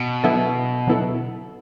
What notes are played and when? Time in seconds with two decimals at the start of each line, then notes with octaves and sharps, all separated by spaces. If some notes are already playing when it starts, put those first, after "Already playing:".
Already playing: B2
0.23 D3 F#3 B3 E4 A4
0.87 D3 F#3 B3 E4 A4